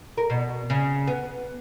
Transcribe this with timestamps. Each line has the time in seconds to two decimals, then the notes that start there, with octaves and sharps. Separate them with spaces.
0.18 A#4
0.30 B2
0.70 C#3
1.07 B3